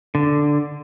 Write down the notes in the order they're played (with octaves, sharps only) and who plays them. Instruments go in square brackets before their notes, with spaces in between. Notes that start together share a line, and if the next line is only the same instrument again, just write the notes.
[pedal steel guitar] D3